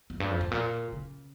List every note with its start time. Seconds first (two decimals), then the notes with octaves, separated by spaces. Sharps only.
0.10 F2
0.20 G2
0.30 F2
0.41 G#2
0.51 A#2
0.92 C#3